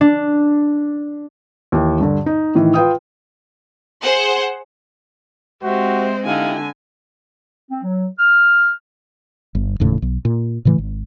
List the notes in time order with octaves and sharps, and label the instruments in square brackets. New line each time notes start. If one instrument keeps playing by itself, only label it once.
[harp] D4
[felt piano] D#2 E3 G5
G2 D3
D#4
A2 D#3 E3
F4 B4 G5 D#6
[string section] G#4 C5 F#5
[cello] G#3 C4 [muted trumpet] F#4 [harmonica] G4 E5 [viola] C5
[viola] D3 G#5 [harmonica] D#4 E4 G4 [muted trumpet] F5
[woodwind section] C4
F#3
F6
[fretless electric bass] G1
E1 D#2 A2 C#3
B1
A#2
A2 C#3 E3 A3
G#1